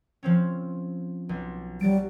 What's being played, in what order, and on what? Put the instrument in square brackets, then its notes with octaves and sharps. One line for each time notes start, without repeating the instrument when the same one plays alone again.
[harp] F3 C4 C#4
B1
[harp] F#3 A6 D7 [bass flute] G3